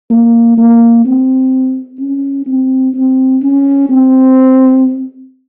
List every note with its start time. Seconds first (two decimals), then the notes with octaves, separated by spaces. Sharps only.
0.10 A#3
0.57 A#3
1.05 C4
1.99 C#4
2.46 C4
2.94 C4
3.42 C#4
3.89 C4